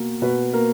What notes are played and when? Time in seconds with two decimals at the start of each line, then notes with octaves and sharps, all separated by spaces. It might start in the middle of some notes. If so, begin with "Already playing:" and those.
Already playing: B2 A#3
0.22 B2 B4
0.53 A#3 A#4